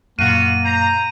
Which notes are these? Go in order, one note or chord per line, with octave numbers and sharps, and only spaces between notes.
F#2 A#2 A#3 F4 F#4 D#7
C5 A#5